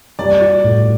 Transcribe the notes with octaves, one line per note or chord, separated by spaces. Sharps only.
G3 D5
F#4
A2